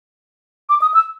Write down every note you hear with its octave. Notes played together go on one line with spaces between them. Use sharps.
D6
D#6
E6